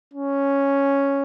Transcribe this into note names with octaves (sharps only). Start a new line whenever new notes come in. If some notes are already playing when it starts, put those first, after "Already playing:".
C#4